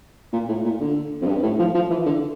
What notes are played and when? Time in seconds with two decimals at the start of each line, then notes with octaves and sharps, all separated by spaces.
0.33 A#2
0.49 A2
0.65 A#2
0.81 D3
1.22 F2
1.27 G2
1.43 A2
1.59 F3
1.75 F3
1.90 E3
2.06 D3